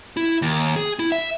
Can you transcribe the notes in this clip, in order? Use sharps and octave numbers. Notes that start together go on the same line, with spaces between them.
E4
D#2
G#4
E4
E5